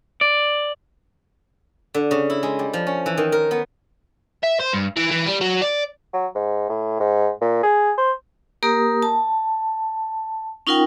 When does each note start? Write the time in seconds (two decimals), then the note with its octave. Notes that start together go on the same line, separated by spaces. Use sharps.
0.21 D5
1.94 D3
2.11 C#3
2.30 E4
2.43 G#3
2.59 G3
2.73 F3
2.87 C#4
3.06 E3
3.17 D#3
3.32 A#4
3.51 B3
4.44 E5
4.60 C5
4.74 G2
4.97 E3
5.11 E3
5.26 G3
5.41 F#3
5.62 D5
6.13 F#3
6.35 G#2
6.70 A2
7.00 G#2
7.41 A#2
7.63 G#4
7.98 C5
8.63 A#3 G4 A#4 D#6
9.03 A5
10.67 C#4 D#4 F4 A#4 F#5 G5